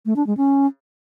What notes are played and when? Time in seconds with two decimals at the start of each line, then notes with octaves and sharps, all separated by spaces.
0.06 A3
0.16 D4
0.27 G#3
0.37 C#4